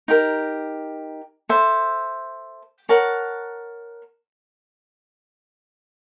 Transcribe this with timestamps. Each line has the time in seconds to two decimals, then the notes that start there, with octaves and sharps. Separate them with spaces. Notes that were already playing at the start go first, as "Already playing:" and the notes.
0.08 D#4 G4 A#4
1.49 A4 C5 E5
2.89 A#4 C#5 F#5 A5